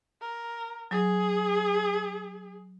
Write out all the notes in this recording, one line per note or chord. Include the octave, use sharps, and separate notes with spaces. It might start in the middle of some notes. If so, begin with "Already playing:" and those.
A#4
F#3 G#4